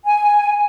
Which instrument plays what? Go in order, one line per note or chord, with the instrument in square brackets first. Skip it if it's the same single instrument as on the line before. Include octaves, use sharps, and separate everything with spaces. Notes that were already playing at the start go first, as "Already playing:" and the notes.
[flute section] G#5